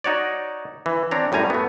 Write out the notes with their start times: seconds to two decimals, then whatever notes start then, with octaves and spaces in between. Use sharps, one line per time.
0.04 D#4 F#4 C#5 D5
0.86 E3
1.11 C4 D4 C#5 A#5
1.32 F#2 A2 G3 G#5 A#5
1.50 A3 B3